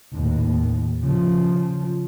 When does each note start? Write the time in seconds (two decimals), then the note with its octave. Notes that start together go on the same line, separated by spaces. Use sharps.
0.14 D#2 A2
1.02 C#3 F3